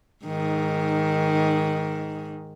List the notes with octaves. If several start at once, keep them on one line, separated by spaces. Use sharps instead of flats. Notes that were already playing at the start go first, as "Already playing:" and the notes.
G#2 D#3